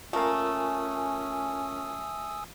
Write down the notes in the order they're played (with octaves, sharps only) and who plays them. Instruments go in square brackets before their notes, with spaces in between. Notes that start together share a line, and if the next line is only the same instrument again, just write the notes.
[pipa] A3 A#3 [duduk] C#4 [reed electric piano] F4 A#4 [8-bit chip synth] G#5 D#6 E6